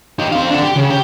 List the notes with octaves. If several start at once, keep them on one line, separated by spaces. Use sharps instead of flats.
D#4 G4
C4 F5
D4 F#5
G4
C#3
G4